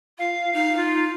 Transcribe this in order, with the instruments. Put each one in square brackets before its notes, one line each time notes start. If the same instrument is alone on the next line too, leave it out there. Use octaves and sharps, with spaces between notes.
[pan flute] F4 [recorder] F5
[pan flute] D#4 [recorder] F5
[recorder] F4